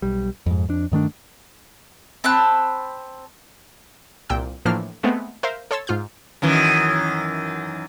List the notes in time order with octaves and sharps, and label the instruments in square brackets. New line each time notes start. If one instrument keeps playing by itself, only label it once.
[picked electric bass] B1 G3
F2 G#2
F2 D4
G2 D#3 A3 D4
[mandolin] C4 A5 B5 F#6
[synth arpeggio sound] C2 A#2 G5 E6
A2 E3 F3 A#3 D4 F6
G#3 A3 B3 C4
A#4 C5 E5 F5
A4 C#5 C6 E6 A6
G#2 F4 F6 G6
[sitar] F#2 D#3 E3